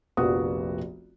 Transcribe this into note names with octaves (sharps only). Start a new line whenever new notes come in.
F1 A#1 A#3 B3 F#4 D#6